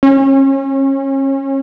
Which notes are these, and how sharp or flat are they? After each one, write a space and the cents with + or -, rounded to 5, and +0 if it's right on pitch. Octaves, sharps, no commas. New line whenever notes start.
C#4 -30